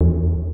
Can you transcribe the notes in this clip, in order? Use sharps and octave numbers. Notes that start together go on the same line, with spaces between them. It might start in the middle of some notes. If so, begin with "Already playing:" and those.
E2